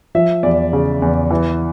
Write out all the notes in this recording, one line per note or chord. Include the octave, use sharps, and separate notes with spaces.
F3 E5
E2 D5
C#3
E2
E3